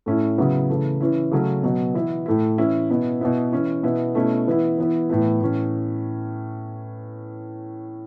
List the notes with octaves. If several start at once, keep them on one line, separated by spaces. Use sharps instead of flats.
A2 A3 C#4 E4
C#3 F#3 B3 E4
C#3 E3 A3
E3 C#4 E4
C#3 F#3 A3 C#4
B2 F#3 B3
E3 B3 E4
A2 A3 E4
E3 C#4 E4
B2 B3 E4
B2 B3 E4
E3 C#4 E4
B2 B3 E4
B2 A3 C#4 E4
E3 B3 E4
E3 B3 E4
A2 E3 B3 E4
A2 E3 C#4